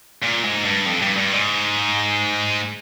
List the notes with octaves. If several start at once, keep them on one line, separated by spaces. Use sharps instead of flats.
A#2
G#2
G2
F2
G2
G2
G#2